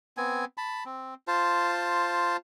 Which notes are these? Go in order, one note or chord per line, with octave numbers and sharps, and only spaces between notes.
B3 C4 G#5
A5 B5
C4
F4 C5 A5